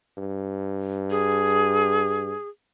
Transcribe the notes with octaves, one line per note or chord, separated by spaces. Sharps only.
G2
G#4